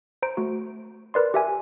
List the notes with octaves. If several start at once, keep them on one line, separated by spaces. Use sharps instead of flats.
C5 A#5 D7
A3 F#4
A#4 B4 D5 C6
G4 E5 G#5